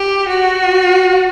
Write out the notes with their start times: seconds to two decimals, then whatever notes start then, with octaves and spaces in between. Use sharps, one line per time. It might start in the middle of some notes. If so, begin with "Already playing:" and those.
Already playing: G4
0.29 F#4